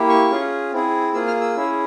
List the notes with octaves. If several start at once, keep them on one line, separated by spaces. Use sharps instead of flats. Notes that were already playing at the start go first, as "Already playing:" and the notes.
Already playing: A#3 E4 G4
C#6
C#4 F4 G#4
C4 E4 G#4
A#3 F4 G#4 E6
F6
E6
C#4 E4 G#4